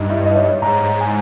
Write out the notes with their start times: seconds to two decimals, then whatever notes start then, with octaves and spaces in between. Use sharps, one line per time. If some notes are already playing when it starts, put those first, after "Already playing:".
Already playing: G2 D#4
0.10 E4
0.26 D#5
0.36 C#5
0.62 G#2 A#5
1.01 G#5